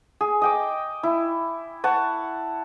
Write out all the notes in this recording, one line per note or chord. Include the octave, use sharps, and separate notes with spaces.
G#4
D#5 G5 D6
E4
F#5 A5 C#6